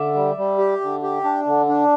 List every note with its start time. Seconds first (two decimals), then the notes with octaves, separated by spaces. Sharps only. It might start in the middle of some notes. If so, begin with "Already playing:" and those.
Already playing: D3 D5 E5
0.14 G3
0.36 G3
0.58 G4
0.81 D3
1.02 G4
1.24 D4
1.46 D3
1.69 D4